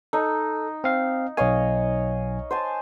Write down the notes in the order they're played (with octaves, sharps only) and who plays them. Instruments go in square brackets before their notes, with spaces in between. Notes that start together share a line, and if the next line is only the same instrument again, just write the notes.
[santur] D#4 [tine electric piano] A4
[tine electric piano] C4 F5
[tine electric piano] B1 G#5 [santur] C#5 D#5 F5
[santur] C5 G#5 A5